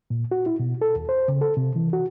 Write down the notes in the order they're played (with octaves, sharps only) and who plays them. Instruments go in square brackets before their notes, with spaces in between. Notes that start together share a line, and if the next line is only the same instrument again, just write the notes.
[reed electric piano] A#2
F#4
E4
B2
A4
D#2
C5
C#3
A4
C3
E3
F#4